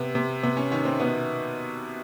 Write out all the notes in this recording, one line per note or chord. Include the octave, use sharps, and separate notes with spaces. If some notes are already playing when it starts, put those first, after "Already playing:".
Already playing: C3 B3
C3
C3 B3
C#4
D#3 C#4
C4
B2 B3